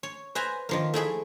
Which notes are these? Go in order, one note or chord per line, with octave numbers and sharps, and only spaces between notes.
C#5
B4 C5 E5 G#5 A#5
D#3 F3 A#3
A3 E4 G#4 E5